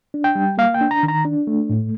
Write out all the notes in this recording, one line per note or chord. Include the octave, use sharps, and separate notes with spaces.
D4
G5
G3
A#3 F5
G5
D4
A#5
D#3
A#5
D4
A3
A2